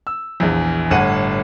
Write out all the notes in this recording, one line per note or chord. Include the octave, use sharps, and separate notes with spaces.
E6
A#1 E2
G1 A2 F#5 D#7